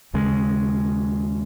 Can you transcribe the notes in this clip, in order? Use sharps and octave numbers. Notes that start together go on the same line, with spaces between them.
D#2 C#3 G#3